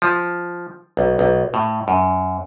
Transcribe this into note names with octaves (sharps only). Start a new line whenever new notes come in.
F3
B1
B1
A2
F#2